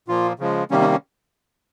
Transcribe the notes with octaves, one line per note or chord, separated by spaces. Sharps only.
A#2 F3 A#3 F4
C#3 F3 G#3
C3 D#3 G3 A#3 C#4
C#4
C#4